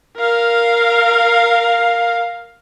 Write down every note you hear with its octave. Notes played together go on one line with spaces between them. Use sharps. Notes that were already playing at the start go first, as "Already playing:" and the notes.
A#4 F5